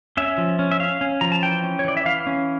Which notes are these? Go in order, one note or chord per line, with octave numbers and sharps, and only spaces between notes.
C#4 E5
F3
C#4
E5
C#4 F5
C#4
F3 A#5
A5
E3 G5
C#4
C#5
E3 D5
E5
E3 F5
C#4